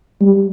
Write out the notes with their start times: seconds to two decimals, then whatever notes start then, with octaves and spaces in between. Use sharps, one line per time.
0.21 G3